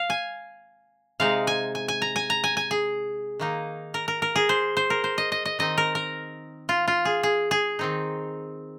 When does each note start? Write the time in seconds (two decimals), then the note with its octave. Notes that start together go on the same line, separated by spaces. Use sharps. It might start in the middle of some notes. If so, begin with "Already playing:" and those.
Already playing: F5
0.10 G#5
1.20 C3 G#3 D#4 F5
1.47 G#5
1.75 G#5
1.88 G#5
2.02 A#5
2.16 G#5
2.30 A#5
2.44 G#5
2.57 G#5
2.71 G#4
3.39 D#3 A#3 D#4
3.94 A#4
4.08 A#4
4.22 A#4
4.36 G#4
4.49 C5
4.77 C5
4.90 A#4
5.04 C5
5.18 D#5
5.32 D#5
5.45 D#5
5.59 D#3 C4 D#4 D#5
5.78 A#4
5.95 A#4
6.69 F4
6.88 F4
7.05 G#4
7.23 G#4
7.51 G#4
7.79 D#3 C4 D#4